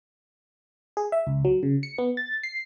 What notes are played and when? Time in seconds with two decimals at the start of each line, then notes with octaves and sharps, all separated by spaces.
0.97 G#4
1.12 E5
1.27 C#2
1.45 F#3
1.63 C#3
1.83 C#7
1.98 B3
2.17 A6
2.43 C7